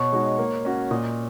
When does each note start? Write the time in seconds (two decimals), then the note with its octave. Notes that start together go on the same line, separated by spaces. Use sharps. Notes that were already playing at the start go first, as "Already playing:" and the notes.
Already playing: B2 C#5
0.13 G#3 D#4 F#4
0.39 A#3
0.65 C#4 F#4
0.91 A#2 D#5